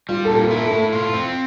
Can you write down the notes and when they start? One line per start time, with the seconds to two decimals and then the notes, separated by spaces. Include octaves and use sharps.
0.09 G3 F4
0.25 A#2 A4
0.40 F4
0.51 E4
0.56 A4
0.71 A2 A4
0.93 F4
1.13 C4